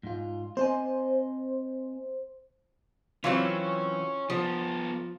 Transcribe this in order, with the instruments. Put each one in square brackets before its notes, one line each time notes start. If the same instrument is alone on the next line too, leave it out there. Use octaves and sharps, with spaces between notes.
[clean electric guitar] G#2 F4
[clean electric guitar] C4 D#5 G#5 [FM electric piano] C5
[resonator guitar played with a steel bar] E3 F#3 C4 [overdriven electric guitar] C#4 [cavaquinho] F4 C#5
[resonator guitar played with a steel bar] F3 [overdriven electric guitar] B3 A4